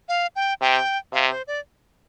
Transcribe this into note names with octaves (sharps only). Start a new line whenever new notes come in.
F5
G5
C3 G5
C3 F5
C5
D5